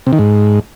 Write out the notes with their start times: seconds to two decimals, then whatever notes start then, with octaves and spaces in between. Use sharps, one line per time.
0.07 C3
0.13 D#3
0.19 G#2